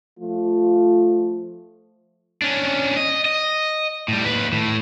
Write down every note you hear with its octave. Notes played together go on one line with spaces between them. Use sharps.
F3 A3 F4
C#4 D4
D#5
D#5
A2 G3
D#2 B4
A2